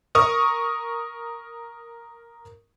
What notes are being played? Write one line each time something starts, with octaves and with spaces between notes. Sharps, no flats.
A#4 C#6 D#6